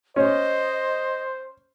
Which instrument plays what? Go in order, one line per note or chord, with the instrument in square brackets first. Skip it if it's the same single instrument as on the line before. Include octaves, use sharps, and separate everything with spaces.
[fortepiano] C#4 [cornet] C5 [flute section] D#5